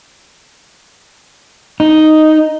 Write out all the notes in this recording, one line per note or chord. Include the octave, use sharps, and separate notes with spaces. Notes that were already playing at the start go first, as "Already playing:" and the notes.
D#4